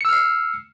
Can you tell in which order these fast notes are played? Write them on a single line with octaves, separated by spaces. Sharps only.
C#7 E6 F6 C7